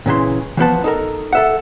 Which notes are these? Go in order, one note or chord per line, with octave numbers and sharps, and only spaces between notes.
A#2 C#3 E3 C6
E3 F3 B3 A5
D#4 A4 A#4
A4 E5 F#5